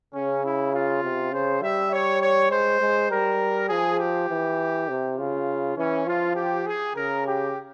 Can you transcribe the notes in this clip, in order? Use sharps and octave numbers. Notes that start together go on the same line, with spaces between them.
C#3 C#4
E4
F4
C3
C#3 C5
G3 E5
C#5
C#5
G#3 C5
G#3
G3 A#4
F3 G#4
G4
E3
C3
C#3 F4
E3 C#4
F3 F4
G4
G#4
C#3 A#4
G4